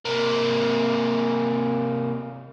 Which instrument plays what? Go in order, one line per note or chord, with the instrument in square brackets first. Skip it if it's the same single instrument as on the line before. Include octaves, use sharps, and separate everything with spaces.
[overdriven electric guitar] C3 A#3